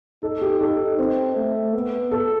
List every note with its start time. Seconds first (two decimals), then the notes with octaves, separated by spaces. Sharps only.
0.23 D#4 A4
0.42 G4
0.61 D#4 A4
0.99 C4
1.36 A3
1.74 B3
2.12 A4